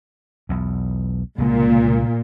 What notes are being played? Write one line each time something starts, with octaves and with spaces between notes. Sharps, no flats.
B1 E2
C2 A#2 C#3 G#3